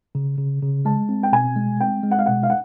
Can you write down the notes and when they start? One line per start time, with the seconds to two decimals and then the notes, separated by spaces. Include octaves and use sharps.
0.15 C#3
0.38 C#3
0.62 C#3
0.85 G#3 A5
1.09 C4
1.23 G5
1.32 B2 G#5
1.56 G#3
1.80 C4 G5
2.03 G#3
2.11 F#5
2.19 F5
2.26 B2 F#5
2.43 F5
2.50 F#5